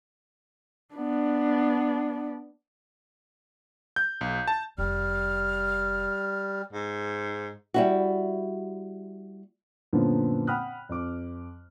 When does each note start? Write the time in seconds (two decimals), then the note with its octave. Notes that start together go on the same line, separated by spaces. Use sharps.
0.94 B3 D4
3.96 G6
4.21 B1
4.48 A5
4.78 F1 G3 F6
6.72 G#2
7.74 G3 E4 F#4
9.93 F#2 A#2 D3 F3 A#3 B3
10.47 F#5 G5 B5 D#6 F6 F#6
10.89 F2 D6